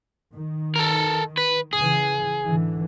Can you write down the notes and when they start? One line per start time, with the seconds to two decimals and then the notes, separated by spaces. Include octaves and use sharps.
0.33 D#3
0.76 A4 A#4
1.37 B4
1.73 C#3 E3 G#4
2.44 G#2 D3 E3